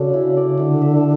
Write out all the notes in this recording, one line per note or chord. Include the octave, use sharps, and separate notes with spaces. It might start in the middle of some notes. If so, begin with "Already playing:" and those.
Already playing: C#3 D4 F#4 A4 D5
E4
D5
D3 E4
E5